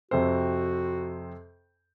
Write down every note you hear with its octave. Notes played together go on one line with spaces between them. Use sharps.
F2 C3 F#4 C5